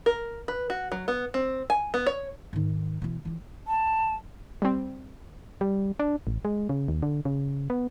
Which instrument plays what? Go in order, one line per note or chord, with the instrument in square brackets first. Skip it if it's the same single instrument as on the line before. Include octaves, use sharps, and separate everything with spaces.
[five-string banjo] A#4
B4
F#4
F#3
B3
C4
G#5
B3
C#5
[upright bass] G#2 D#3
B2 E3
E3 F4
[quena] A5
[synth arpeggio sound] G3 C4
[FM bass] G3
D4
A1
G#3
C#3
D#2
D3
C#3
B3